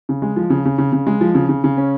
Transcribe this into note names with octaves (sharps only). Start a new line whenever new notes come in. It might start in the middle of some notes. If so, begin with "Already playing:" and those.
C#3
G#3
F3
C#3
C#3
C#3
C#3
G#3
F3
C#3
C#3
C#3
C#4